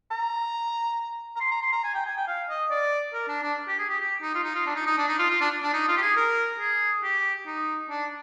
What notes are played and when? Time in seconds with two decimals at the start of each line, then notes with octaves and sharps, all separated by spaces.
0.11 A#5
1.36 A#5
1.41 C6
1.51 A#5
1.62 C6
1.73 A#5
1.84 G#5
1.94 G5
2.06 G#5
2.17 G5
2.27 F5
2.50 D#5
2.70 D5
3.14 A#4
3.28 D4
3.43 D4
3.68 G4
3.79 G#4
3.89 G4
4.00 G4
4.22 D#4
4.35 F4
4.44 D#4
4.55 F4
4.66 D4
4.76 D#4
4.87 D#4
4.98 D4
5.08 D#4
5.19 F4
5.30 F4
5.41 D4
5.63 D4
5.73 D#4
5.88 F4
5.97 G4
6.02 G#4
6.17 A#4
6.60 G#4
7.03 G4
7.46 D#4
7.90 D4